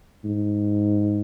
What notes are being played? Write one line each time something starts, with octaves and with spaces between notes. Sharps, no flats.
G#2